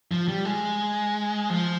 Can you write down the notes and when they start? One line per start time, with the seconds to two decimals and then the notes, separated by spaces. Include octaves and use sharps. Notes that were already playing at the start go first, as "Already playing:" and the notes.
0.12 F3
0.28 G3
0.45 G#3
1.50 F3